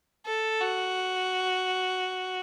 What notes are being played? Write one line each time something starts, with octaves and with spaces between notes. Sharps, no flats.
A4
F#4